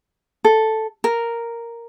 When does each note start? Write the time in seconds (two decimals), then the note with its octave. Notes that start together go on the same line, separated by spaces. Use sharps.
0.45 A4
1.04 A#4